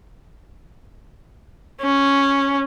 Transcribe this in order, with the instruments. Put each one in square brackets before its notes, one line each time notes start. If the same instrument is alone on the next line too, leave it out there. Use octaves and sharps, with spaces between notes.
[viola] C#4